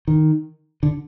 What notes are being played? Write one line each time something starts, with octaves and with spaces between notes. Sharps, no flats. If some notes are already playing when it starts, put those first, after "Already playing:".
D#3
D3